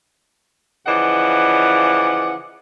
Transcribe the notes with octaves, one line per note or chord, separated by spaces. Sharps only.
C#3 E3 F3 D5 D#5 F#5